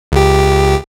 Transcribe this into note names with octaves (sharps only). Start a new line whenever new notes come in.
C#2 G4